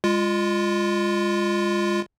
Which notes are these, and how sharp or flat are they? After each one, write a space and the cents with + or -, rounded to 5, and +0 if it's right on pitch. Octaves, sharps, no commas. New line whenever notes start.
G#3 -30 F4 -5